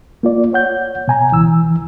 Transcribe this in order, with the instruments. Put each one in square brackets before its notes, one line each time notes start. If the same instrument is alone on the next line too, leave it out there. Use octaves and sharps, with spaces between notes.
[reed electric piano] A#3 F4 D5
C#5 F#5 G6
B2 G#5 A#5
C#2 E3 E6